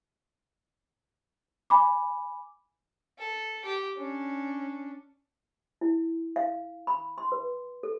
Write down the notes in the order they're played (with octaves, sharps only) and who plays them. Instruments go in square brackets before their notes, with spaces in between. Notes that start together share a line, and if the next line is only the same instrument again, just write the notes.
[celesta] G#5 B5 D6
[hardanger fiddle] A4
G4
C#4 D4
[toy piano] E4
F5
B5
C6
B4
A4